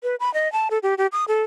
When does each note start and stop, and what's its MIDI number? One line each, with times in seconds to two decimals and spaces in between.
0.03 0.15 71
0.20 0.32 83
0.34 0.51 75
0.52 0.68 81
0.71 0.78 69
0.83 0.94 67
0.98 1.07 67
1.12 1.25 87
1.28 1.43 69